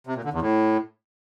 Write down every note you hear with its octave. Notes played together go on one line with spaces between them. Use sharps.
C3
A#2
D3
E2
A2